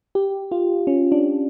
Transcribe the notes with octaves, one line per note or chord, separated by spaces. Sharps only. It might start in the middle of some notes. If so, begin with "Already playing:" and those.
G4
F4
C#4
D4